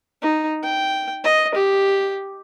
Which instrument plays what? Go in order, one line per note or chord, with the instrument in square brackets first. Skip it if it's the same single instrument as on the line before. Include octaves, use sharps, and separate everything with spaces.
[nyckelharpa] D#4
G5
D#5
G4